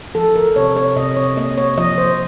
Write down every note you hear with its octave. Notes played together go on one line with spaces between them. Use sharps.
F3 A4
A#4
C3 C#5
C#5
C3 D#5
C#5
A#3 D#5
C#5
F3 D#5
C5